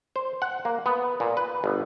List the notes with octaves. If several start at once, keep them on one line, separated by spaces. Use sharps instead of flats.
C5
F#5
A#3
B3
A#2
B4
G1